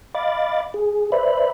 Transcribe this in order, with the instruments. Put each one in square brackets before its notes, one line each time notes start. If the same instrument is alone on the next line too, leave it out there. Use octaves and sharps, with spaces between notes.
[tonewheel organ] D#5 F5 B5 D6 A6
G#4
B4 C5 D5 E5 B5